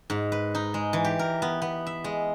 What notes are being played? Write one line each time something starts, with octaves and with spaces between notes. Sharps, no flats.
G#2
B4
D#4
G#3
E3
G4
A#4
B3
B3
E5
G#3